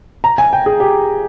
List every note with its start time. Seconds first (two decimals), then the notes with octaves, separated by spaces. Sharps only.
0.24 A#5
0.38 G#5
0.53 G5
0.66 G#4
0.80 G4